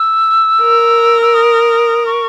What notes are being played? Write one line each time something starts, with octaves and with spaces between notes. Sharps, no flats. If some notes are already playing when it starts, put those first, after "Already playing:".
Already playing: E6
A#4
E6
D#6
C#6